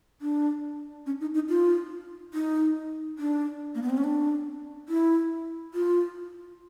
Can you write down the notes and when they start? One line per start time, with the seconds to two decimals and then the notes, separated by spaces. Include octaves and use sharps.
0.21 D4
1.06 C#4
1.21 D#4
1.34 D#4
1.49 F4
2.34 D#4
3.19 D4
3.75 A#3
3.82 B3
3.90 C4
3.97 C#4
4.04 D4
4.89 E4
5.74 F4